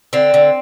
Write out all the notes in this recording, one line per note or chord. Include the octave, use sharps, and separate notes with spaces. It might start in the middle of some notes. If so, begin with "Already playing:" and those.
D3 C4
D3